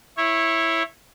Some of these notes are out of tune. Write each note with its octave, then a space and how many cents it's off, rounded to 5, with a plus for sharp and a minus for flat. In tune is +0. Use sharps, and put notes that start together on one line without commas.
E4 +0 C#5 -20